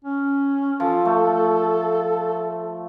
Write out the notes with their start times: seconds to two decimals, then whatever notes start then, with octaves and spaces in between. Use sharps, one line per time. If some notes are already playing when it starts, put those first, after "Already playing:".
0.05 C#4
0.80 F3 A4
1.05 A3